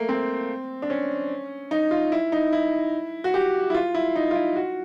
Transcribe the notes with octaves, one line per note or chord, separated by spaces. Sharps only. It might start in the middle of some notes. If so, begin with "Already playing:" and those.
Already playing: A3 A#3
C4
D4
C#4
D#4
F4
E4
D#4
E4
F#4
G4
E4
F4
E4
D#4
F4
E4
F#4